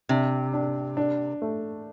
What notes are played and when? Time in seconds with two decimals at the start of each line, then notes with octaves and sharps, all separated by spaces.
0.09 C3 D4
0.53 D4
0.97 D4
1.42 A3